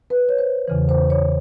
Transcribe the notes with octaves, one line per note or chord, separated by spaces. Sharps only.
B4
C#5
C5
E2 C#3 E3
C5
C#5